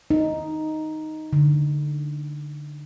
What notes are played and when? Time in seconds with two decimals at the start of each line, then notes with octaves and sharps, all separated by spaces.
0.11 D#4
1.33 D3